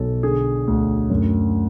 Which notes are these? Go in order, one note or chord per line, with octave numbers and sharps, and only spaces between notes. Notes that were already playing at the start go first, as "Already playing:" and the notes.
Already playing: B1 B2 A4
D3 G#4
D2
F#2